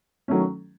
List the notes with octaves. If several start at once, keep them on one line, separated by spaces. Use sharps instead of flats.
D#3 F#3 A3 C#4